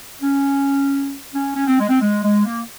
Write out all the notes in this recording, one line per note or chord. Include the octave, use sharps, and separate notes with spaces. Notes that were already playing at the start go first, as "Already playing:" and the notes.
C#4
C#4
C#4
C4
G#3
C4
G#3
G#3
A#3